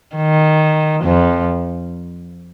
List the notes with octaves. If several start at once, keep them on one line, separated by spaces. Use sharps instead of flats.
D#3
F2 F3